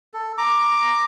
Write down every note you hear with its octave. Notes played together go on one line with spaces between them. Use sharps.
A4
A#5 D6